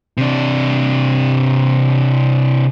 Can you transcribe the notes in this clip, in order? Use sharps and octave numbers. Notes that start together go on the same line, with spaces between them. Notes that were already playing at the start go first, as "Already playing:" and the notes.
C3 D4